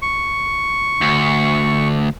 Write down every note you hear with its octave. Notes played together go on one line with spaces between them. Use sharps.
C#6
D2